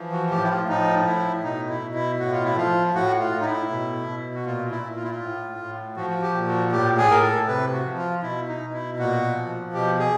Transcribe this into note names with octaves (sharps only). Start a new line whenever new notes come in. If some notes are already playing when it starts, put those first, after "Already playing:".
Already playing: E3 F3
F#4
A2 G4
E4
F4
F3 D#4
A2 E4
B2 D#4
E4
B2
E4
A2 F#4
F4
E4
F3 F4
A2 F#4
F4
A2
D#4
E4
B2
B2
F#4
A#2 F4
E4
A#2
F4
E4
F4
A2
A2
F3 F#4
F#4
G4
A#2
F#4
A2 G4
G#4
A2 A#4
A4
C3 B4
F#4
F3
F4
B2 E4
D#4
B2
E4
A#2 F#4
F3
B2 G4
G#4